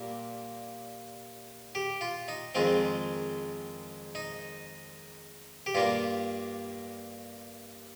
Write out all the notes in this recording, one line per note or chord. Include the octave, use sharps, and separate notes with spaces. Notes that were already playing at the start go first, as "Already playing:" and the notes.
Already playing: A#2 G3 A#3
G4
F4
D#4
F2 D#3 G#3 C4 F4
D#4
G4
G2 G3 A#3 F4